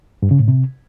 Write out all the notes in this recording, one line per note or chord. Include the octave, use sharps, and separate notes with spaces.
G2
C#3
A2
C3